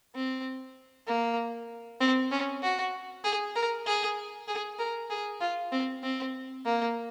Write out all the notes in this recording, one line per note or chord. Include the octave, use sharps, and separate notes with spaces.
C4
A#3
C4
C#4
F#4
G#4
A#4
G#4
G#4
A#4
G#4
F4
C4
C4
A#3